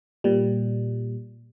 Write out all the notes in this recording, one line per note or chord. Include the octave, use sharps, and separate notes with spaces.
A#2 G3